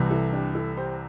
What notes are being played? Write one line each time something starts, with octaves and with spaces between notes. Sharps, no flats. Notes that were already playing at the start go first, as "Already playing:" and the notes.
Already playing: C2 C3 E3
E4 A4
D4 G4
E4 A4
G4 C5